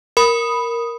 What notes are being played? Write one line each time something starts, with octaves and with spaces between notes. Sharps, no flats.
A#4 B5 D#6